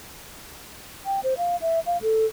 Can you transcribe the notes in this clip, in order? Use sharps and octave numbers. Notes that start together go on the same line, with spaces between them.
G5
C5
F5
E5
F5
A4